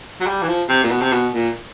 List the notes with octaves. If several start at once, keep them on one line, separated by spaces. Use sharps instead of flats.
F#3
G3
E3
F3
C3
A#2
B2
C3
B2
A#2